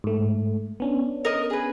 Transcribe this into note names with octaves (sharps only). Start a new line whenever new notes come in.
G#2 A3
B3 C#4 D4
A#4 D#5
G#4 B4